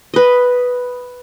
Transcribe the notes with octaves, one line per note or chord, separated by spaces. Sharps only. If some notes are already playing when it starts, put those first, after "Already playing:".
B4 D#5